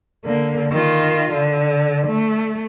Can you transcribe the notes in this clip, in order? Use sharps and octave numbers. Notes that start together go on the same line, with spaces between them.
D3 A#3
D#3 F4
D3
A3